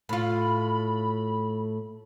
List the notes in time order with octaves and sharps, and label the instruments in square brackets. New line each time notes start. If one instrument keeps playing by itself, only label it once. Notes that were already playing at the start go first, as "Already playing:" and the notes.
[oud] A2 F4 [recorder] B5